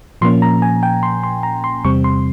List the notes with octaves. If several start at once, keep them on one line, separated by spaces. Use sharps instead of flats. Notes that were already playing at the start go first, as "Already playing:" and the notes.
A#2 F3 A#3 C#4 C6
A#5
G#5
G5
C6
C6
A#5
C6
E2 C3 G3 C4 C#6
C6